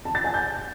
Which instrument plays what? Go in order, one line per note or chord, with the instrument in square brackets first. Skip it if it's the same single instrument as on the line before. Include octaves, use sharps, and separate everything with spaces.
[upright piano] A5
A6
G#5
G6